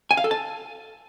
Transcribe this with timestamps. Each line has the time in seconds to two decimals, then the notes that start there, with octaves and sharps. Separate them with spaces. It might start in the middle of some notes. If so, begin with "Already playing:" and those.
0.11 G#5
0.17 F5
0.24 A4
0.31 A5